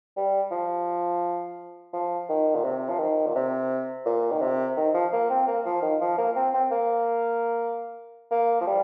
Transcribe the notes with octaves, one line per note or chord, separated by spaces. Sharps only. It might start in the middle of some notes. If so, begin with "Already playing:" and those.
G3
F3
F3
D#3
A#2
C3
F3
D#3
A#2
C3
A#2
D#3
C3
D#3
F3
A#3
C4
A#3
F3
D#3
F3
A#3
C4
C4
A#3
A#3
F3
G3